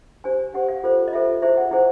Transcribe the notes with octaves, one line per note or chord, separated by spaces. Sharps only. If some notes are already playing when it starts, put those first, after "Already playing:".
D4 G4 C5 G#5
D4 G4 C5 F#5
F5
F4 A4 C5
D#5
F4 A4 C5 E5
E4 G#4 C5 E5
F#5
E4 G#4 C5 F#5